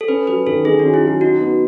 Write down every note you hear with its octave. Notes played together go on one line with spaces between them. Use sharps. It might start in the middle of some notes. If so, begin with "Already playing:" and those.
A4
C#4 B4
F#3 B4
D#3 A4
D#3 G#4
C#4 F#4
E4
F#3 D#4
D#4 F#4
B3